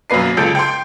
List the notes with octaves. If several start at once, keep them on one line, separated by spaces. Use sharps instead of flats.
F#2 B2 A#3 B4 C7
C#2 A4 G6 D7
G5 C6